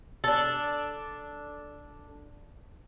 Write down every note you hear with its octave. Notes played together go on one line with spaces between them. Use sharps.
D4 A4